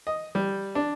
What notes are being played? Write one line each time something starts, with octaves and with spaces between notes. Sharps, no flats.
D#5
G3
D4